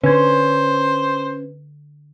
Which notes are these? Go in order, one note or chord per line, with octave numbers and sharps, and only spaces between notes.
D3 C#4 B4 C5 G#6